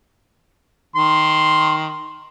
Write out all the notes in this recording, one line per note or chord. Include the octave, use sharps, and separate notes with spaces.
D#3 C6